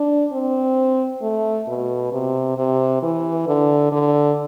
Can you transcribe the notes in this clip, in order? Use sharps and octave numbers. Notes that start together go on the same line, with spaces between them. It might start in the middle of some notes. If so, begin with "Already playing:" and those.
Already playing: D4
C4
A3
B2
C3
C3
E3
D3
D3